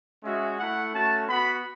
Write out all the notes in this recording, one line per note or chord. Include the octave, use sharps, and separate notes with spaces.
G#3 C#4 F#4 E5
A3 E4 F#5
A3 C#4 F#4 A5
B3 F#4 B5